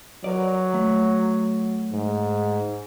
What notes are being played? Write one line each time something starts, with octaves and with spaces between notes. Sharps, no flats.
F#3 A#4 B4 D5
A3
G#2